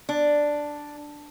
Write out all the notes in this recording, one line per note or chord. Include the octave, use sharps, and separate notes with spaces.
D4